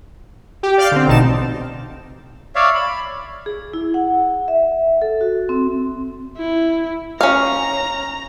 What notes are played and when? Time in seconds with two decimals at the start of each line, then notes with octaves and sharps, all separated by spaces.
0.63 G4
0.78 D5 F5 F6 G6 A6
0.92 D3 C4
1.07 A1 B2 D#4 A5 E7
2.55 C#5 D5 E5 F5
2.75 B5
3.46 G#4
3.73 E4
3.94 F#5
4.48 E5
5.02 A4
5.21 F#4
5.49 C4
6.37 E4
7.21 C#4 F5 A#5